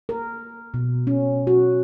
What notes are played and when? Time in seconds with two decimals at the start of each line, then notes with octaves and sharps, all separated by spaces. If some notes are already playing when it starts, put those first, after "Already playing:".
0.09 A#4
0.74 B2
1.07 C#4
1.47 F#4